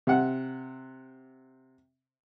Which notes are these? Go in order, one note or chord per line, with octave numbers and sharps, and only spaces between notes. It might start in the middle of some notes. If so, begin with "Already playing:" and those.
C3 F#5